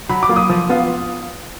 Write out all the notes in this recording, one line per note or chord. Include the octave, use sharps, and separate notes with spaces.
F#3 B5
D6
A#3 F4
D#6
F3
B3 F4